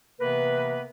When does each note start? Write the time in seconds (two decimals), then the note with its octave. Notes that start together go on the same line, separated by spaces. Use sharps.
0.21 C3 E3 A#3 B3 A#4 B4